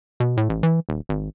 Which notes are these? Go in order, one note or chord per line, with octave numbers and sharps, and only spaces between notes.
B2
A2
A1
E3
D#1
G#1